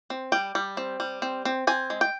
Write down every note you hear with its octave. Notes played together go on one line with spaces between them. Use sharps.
C4
G3 G5
G3
C4
G3
C4
C4
C4 G#5
G#3
G5